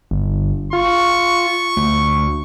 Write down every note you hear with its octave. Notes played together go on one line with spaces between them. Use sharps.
G1
F4 C#6
D2